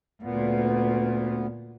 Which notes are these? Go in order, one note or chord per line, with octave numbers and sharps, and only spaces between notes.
D2 A#2 B3